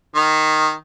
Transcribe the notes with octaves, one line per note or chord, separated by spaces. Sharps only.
D#3